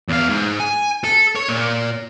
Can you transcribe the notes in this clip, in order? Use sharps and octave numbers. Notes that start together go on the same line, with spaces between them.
E2 F5
G#2
G#5
A4
C#5
A#2